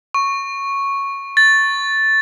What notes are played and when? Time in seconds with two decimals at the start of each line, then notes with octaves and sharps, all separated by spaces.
0.14 C#6
1.37 A6